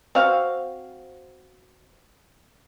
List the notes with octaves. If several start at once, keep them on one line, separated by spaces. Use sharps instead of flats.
C4 F#4 F5